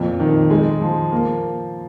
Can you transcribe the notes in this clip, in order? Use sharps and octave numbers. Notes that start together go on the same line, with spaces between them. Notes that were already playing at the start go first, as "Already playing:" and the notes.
Already playing: F2 A#2
D#3
G#3
F3
A#3